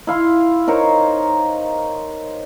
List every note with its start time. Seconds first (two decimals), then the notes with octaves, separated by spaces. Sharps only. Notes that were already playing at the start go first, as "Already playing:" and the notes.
0.07 E4 F5 C6
0.67 D#4 A#4 C5 C#5